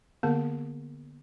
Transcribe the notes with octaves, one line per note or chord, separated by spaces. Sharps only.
D3 A#3 B3 A#4